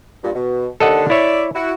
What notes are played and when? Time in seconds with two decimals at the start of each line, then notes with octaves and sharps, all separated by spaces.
0.24 G2 A#2
0.35 B2
0.80 D#2 D3 A4 D#5 F#5
1.10 E4 C#5 D5 E5
1.55 E4 F#4